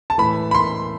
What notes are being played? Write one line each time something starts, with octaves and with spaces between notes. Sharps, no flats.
A5
A2 E3 B5
B5
C6